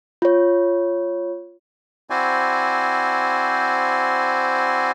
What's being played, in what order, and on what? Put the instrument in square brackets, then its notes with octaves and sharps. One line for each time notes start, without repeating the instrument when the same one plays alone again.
[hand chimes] F4 C#5
[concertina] C4 E4 F#4 C5 D5 G#5